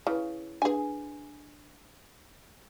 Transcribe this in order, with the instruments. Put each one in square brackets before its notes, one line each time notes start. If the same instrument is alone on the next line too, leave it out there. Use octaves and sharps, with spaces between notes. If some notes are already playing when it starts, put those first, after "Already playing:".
[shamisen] C#3 [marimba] E4 B4
[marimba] D4 B4 [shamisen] G#4 G#5